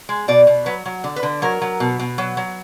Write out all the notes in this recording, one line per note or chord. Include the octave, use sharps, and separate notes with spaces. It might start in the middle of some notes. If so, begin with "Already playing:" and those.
G#3
B2 D5
B2
F#3 B4
F#3
D3
B4
D3
F#3 A#4
F#3
B2
B2
F#3
F#3